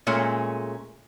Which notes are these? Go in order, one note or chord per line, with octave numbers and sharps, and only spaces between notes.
A#2 G#3 A3 C#4